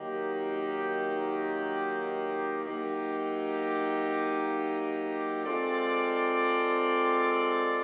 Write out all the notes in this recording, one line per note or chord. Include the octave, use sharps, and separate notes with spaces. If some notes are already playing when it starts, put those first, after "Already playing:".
Already playing: D#3 F#3 A#3 D#4 G4
F#3 A#3 D#4 G4
G#3 C4 F4 A4 D5